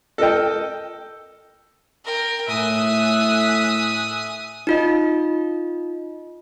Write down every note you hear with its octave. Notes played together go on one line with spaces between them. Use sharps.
A4 A#4 D#5 G5
A#4 G5
A2 E5 G#5 D#6 F#6
D#4 F4 D#5